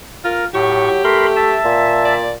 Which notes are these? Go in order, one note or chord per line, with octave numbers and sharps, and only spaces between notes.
F4 A#4
A2 F#3 G4 C#6
A3 A#4 B5 C6
E5 A5
A#2
D5